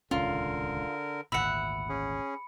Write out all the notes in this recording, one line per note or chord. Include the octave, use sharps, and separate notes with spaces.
D#1 C#2 D3 C#4 F4 A#4
G#1 D2 A#2 E5 F#5 B5 C#7
C#4 G#4